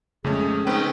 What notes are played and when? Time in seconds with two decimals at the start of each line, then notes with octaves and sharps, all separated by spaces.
0.24 F2 C#3 G#3 A3 C#4 G#4
0.67 D#3 C4 C#4 B4 G5